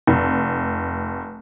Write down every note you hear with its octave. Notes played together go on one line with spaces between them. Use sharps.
F1